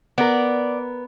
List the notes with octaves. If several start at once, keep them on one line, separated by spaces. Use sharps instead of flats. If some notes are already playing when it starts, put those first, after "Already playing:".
B3 A#4 D5